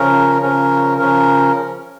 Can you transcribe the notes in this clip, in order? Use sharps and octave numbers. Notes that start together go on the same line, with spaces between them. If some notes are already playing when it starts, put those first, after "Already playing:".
Already playing: C#3 F3 C#4 A#4
C#3 F3 C#4 A#4
C#3 F3 C#4 A#4